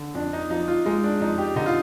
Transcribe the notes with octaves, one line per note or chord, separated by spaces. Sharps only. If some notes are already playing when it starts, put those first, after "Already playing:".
Already playing: D3
F2 D4
D#4
F3 D#4
F4
G#3 D#4
D4
F2 D#4
G4
D3 D#4
F4